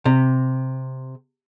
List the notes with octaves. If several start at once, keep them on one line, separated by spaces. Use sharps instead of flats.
C3